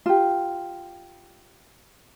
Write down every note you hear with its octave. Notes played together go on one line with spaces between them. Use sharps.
F4 G4